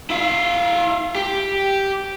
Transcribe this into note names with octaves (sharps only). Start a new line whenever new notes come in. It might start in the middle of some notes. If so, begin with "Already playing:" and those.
E4 F5
G4